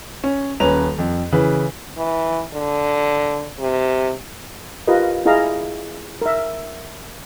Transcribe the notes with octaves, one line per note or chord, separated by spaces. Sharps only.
C#4
D#1 C#4 B4 A#5 F7
F2
C#3 E3 B4
E3
D3
C3
F4 G4 A#4 B4 D#5
E4 G#4 D#5 F5 A#5
A#4 E5